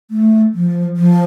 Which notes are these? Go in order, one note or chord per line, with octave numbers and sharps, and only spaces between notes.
A3
F3
F3